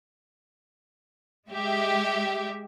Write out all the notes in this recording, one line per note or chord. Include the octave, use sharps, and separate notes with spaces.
G#3 G4 E5